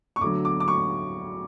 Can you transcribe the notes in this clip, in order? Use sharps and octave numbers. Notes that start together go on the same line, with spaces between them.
C#6
D2 D3 F#3 D6
D6
D6
C#6